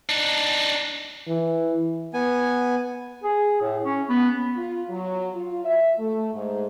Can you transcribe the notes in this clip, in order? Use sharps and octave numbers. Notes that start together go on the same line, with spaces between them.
D4 D#4
E3
B3 G#5
G#4
A2
C#4
B3
F4
F#3
F4
E5
A3
G#2